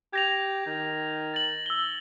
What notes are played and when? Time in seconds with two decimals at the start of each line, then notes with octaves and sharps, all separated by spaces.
0.13 G4 G#6 A#6 F7
0.66 D#3
1.34 A6 F#7
1.66 E6 G7